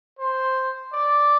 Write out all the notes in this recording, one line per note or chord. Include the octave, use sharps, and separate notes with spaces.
C5
D5